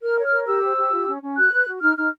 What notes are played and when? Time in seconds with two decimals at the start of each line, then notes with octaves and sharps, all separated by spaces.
0.02 A#4 F6
0.18 C#5
0.24 F6
0.32 A#4
0.47 G4 E6
0.62 C5
0.77 G4
0.92 F4
1.07 C#4
1.22 C#4
1.37 F#4 F#6
1.52 B4
1.67 F#4
1.82 D#4 F6
1.97 D#4 F6